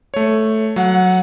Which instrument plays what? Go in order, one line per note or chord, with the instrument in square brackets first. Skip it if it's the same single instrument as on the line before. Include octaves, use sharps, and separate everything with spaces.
[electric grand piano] A3 C#5
[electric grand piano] F#3 [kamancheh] F#5